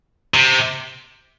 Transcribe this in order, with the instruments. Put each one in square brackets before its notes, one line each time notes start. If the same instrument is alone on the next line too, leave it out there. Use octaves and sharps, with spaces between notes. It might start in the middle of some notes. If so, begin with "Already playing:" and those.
[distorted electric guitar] C3